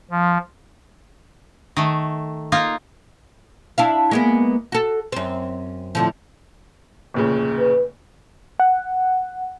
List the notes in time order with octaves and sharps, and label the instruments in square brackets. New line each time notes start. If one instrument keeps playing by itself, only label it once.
[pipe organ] F3
[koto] D#3 A3
A#3 D#4 F4
[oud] D4 E4 F5
G#3 A#3 B3
F#4 A4
F#2 C4
A2 D3 F3
[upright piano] F1 A#2 C#3
[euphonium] B4
[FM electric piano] F#5